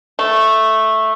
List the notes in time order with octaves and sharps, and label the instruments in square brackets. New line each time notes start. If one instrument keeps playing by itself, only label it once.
[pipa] A3